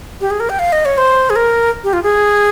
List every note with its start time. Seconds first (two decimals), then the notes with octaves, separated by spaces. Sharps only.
0.21 G4
0.31 G#4
0.40 A#4
0.50 G5
0.59 F5
0.72 D#5
0.85 C#5
0.98 C5
1.30 G#4
1.36 A#4
1.84 G4
1.93 F4
2.03 G#4